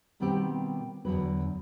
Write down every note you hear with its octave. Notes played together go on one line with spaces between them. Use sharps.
B2 D#3 G3 B3 C4 G4
E2 D3 F#3 B4